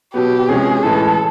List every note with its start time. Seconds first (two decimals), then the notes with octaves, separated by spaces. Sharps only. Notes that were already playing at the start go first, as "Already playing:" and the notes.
0.14 B2 F#3 B3 G4
0.49 C3 F3 G#3 C#4 G#4
0.83 A2 E3 G#3 A4